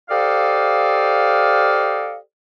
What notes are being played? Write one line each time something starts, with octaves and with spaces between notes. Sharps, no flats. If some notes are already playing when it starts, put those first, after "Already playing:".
G4 A4 C5 D5 D#5 F5